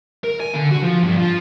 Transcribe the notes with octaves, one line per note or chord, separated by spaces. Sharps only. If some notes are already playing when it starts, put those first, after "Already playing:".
A#4
G#5
D3
F#4
F3
G2
F3